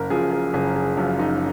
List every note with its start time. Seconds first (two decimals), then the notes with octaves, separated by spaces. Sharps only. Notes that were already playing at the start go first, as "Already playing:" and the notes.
Already playing: F#1 A#4
0.10 F#2 F3 G#4
0.31 G#4
0.53 F#1 G#4
0.76 G#4
0.97 F#2 F3 F4
1.19 D#4